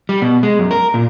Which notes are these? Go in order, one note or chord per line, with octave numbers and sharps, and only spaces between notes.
G3
B2
G#3
F#2
A#4
A#2